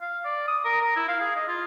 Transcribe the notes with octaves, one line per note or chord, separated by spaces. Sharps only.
F5
D5
D#6
A#4
A#4
E4
F5
G#4
D#5
F4